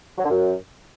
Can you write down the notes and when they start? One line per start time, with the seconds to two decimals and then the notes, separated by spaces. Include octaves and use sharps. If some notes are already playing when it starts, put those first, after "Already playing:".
0.18 F#3
0.24 D3
0.30 F#2